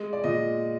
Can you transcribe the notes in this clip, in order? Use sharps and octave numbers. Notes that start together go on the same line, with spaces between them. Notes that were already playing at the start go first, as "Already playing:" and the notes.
Already playing: G#3
D5
A#2 D#5